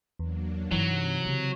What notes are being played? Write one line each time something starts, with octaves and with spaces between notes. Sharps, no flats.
E2 F#3 A#3 D4
G2 C3 E3 F#3 D#4
C#3 C4